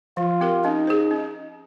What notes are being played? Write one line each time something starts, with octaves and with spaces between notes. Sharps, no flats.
F3 F4
C4 G4 A#4
C#4 D#4
G#4 C5
C#4